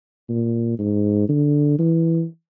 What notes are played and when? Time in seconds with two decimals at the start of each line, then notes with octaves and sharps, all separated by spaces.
0.29 A#2
0.79 G#2
1.29 D3
1.79 E3